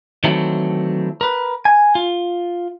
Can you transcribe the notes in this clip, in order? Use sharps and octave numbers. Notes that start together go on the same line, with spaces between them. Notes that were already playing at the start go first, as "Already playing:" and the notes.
D#3 E3 F#3 A3 C4
A#4 B4
G#5
F4